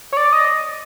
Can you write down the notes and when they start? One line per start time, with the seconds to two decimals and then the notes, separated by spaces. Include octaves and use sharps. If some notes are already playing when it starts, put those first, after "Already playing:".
0.12 C#5
0.17 D5
0.33 D#5